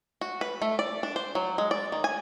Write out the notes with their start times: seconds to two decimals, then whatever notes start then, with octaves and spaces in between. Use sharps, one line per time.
0.21 F#4
0.41 B4
0.62 A3
0.79 D5
1.03 D4
1.16 C5
1.35 F#3
1.58 G#3
1.71 D5
1.92 D#3
2.04 G#5